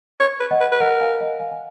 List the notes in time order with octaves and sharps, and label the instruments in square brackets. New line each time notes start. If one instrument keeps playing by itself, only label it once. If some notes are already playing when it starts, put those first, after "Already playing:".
[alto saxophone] C#5
B4
[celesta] D#5 F#5
[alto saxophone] B4
B4
[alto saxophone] A#4 [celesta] D#5 F#5
[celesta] F5 G#5
D#5 F#5
F5 G#5
G#5